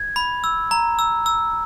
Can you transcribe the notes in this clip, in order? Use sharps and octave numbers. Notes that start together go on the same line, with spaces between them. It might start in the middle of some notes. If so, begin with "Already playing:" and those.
Already playing: G#6
B5
E6
A#5
E6
E6